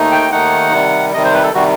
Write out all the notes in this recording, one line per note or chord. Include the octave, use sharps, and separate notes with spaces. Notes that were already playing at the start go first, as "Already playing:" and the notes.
Already playing: D#2 D#3 A3 D#4
G5
D#2 D#3 A3 D#4 F#5
C3 D#3 G3
C3 D#3 G3 D#5
C5
B4
A4
C3 D#3 G3 F#4